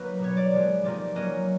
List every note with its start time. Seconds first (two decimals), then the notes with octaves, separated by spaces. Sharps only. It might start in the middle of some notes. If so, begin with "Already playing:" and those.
Already playing: F#3 A#3 D#4 B4
0.19 B2 G3 B3 C#5
0.37 D5
0.53 C3 F3 G#3 B3
0.84 C3 F3 A#3 D#4 D5
1.15 F#3 A#3 C#4 D#5